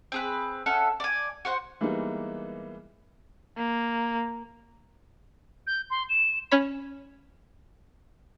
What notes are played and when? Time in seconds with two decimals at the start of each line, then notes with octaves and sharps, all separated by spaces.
0.12 C4 G#4 B4
0.66 C#4 A4 E5 F#5
1.00 D5 G#5
1.45 F#4 C5 F#5
1.81 E3 G3 G#3 A#3 B3 D#4
3.57 A#3
5.66 G6
5.90 C6
6.09 E7
6.51 C#4 C#5 B5